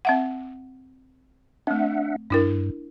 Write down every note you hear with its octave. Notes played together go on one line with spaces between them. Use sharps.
C4 E5 F#5
A3 C4 D4 E5 F#5
G2 D4 E4 A#4